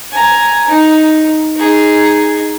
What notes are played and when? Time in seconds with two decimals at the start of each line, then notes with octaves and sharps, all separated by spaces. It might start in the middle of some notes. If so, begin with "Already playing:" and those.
0.12 G#5 A#5
0.68 D#4
1.56 D#4 G#4